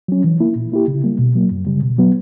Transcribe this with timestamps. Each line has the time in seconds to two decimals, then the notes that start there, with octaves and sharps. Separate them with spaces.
0.08 F#3 C#4
0.24 E3
0.40 A#3 E4
0.56 A#2
0.72 A#3 E4 G4
0.88 C#3
1.04 G3 A#3
1.19 B2
1.35 F#3 A#3
1.51 F#2
1.66 C#3 G3
1.83 B2
1.98 F#3 B3